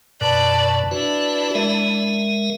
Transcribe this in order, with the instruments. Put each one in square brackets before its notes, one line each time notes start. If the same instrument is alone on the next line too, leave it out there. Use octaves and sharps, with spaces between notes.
[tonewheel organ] F#2 B2 [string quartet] B4 D5 A5
[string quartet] D4 E4 [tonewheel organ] F#4 B4
[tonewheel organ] G#3 A#4 E5